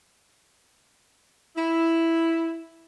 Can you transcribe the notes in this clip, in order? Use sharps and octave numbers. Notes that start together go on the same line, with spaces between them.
E4